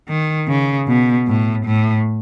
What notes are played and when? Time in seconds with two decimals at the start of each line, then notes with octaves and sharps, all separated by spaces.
0.08 D#3
0.48 C#3
0.88 B2
1.27 A2
1.66 A2